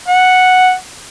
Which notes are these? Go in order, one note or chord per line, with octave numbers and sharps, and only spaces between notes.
F#5